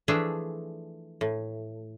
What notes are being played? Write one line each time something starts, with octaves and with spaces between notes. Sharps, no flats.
E3 F3 A3 D4 G#4 E5
A2